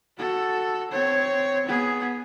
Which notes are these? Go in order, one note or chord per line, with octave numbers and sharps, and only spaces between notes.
F#4 A4
C4 C#5
B3 G#4